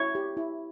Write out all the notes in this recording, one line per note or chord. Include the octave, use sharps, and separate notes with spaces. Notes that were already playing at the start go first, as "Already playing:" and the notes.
Already playing: E4 C#5
G4
E4